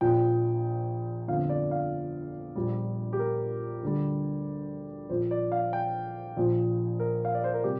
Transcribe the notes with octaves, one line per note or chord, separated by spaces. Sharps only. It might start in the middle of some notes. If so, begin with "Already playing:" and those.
A#1 A#2 F3 G5
G1 F2 D3 F3 F5
D5
F5
A#1 A#2 G3
G4
A#4
D2 D3 G3
A#1 A#2 F3 C5
D5
F5
G5
A#1 A#2 F3
A#4
F5
D5
C5
A#4
C3 G3 G4